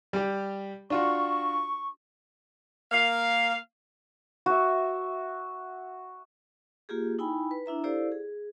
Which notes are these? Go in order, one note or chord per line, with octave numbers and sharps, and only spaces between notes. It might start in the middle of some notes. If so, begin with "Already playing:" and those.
G3 G4
D4 F4 F#4 C#6
A#3 F5
F#4 E5
A#3 F4 G4 G#4
D#4 E4 G5 G#5 B5
B4
D4 E4 E5 A#5
E4 G4 A4 C5 D5 F5
G#4